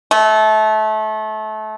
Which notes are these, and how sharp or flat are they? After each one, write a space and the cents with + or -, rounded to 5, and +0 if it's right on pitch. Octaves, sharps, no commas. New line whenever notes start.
A3 -25